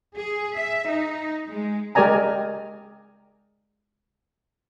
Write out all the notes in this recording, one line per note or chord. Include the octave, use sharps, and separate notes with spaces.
G#4
E5
D#4
G#3
G#3 G4 A#4 D5 G#5 A#5